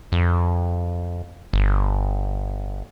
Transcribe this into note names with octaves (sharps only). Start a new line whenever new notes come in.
F2
G1